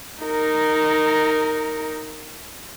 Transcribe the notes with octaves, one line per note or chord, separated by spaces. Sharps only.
D#4 A#4